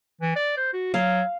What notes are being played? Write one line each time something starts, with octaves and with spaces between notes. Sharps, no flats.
E3
D5
C5
F#4
F#3 F5